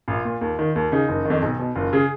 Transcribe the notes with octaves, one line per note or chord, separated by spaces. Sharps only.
A#1 F4
A#2
D#2
D#3
D#2
C#3 D#4
F#1
F2 D#3
B1
B2
F#1 F4
C#3 G#4